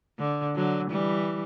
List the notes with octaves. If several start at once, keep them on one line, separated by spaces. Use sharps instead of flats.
D3
D3 F#3
E3 G3